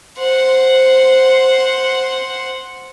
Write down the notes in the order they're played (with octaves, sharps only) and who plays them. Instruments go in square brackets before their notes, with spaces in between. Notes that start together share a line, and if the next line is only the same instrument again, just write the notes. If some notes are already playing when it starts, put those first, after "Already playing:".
[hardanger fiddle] C5 F#5